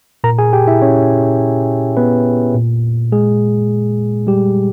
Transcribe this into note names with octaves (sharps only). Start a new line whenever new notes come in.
A#2 A#4 A#5
G#4 G#5
G4 G5
E4 E5
C#4 C#5
B3 B4
A#2
G#3 G#4
G3 G4